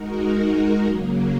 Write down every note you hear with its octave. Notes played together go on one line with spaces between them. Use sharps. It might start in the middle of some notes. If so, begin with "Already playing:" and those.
Already playing: G#3 D#4 F#4 A#4
C#3 F#3 A#3